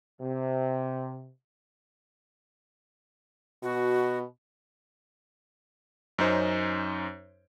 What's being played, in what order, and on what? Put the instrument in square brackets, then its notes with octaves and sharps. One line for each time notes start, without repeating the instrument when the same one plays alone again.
[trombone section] C3
[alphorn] B2 [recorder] F#4
[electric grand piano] F#2 C#4 D#4 C5